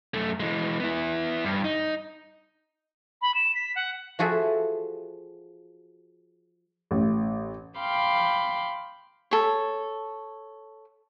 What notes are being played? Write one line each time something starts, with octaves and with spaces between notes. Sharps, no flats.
F#2 A3
E3 G#3
B3 E4
G2
D#4
B5
E7
B6
F#5
F3 F#4 G#4 A4 E5
A1
F5 G5 B5 C6 D6
A4 C#5